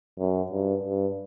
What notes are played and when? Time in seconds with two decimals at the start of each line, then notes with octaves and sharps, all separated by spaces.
0.20 F#2
0.52 G2
0.84 G2